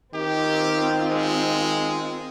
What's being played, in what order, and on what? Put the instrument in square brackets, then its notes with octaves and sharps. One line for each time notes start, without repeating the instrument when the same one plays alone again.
[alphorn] D#3 [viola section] C4 F4 [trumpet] G4
[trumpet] G#3